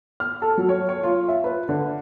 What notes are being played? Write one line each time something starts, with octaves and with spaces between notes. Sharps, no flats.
F6
A4
F#3
C#5
C#5
F4
E5
B4
D3